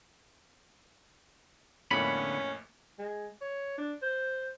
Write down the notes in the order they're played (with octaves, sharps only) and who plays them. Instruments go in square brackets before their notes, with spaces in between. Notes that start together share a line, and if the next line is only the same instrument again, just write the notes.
[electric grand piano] F2 A2 A#3 [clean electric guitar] D3 B3 B5 [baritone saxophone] C#4
[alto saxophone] G#3
C#5
D4
C5